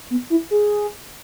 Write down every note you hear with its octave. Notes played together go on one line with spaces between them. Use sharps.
B3
E4
G#4